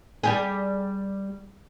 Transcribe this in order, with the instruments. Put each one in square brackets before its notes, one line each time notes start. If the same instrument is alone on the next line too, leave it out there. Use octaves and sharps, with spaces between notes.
[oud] G3 G4 G#4